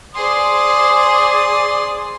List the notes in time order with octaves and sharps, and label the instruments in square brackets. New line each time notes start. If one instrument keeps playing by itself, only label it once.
[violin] G#4 C5 [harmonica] D5 D#6 [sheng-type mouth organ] C6